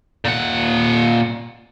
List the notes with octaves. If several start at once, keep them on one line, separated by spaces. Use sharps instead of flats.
A#2 F#5